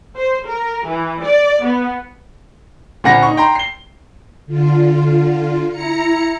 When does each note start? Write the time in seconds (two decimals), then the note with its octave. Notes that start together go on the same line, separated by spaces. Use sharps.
0.15 C5
0.47 A#4
0.86 E3
1.23 D5
1.62 B3
3.04 A#2 D3 C4 F#5 B5 A#6
3.23 D#4 C#6
3.37 G5 A#5 C6
3.55 C7 G7
4.46 D3 F4
5.70 E4 A#5 C#7